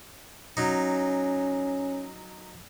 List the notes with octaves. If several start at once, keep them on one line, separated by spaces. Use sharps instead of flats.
F#3 C#4 D#4